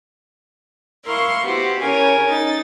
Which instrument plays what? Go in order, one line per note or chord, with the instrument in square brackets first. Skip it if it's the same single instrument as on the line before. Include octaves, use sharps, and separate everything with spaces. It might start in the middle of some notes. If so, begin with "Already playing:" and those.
[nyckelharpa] E4 F5 [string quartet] A#4 C6 C#6
[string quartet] B3 E4 F#4 [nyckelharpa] G4 C5
[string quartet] C#3 C#5 [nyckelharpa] A#4 G#5
[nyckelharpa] D#4 [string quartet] A6